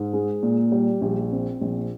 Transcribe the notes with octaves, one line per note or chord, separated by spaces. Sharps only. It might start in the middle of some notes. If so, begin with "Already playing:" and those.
Already playing: G#2
G#3
A#2
G3
A#1
C4
A#1